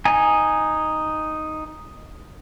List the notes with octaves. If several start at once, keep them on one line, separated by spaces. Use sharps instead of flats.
D#4 G#5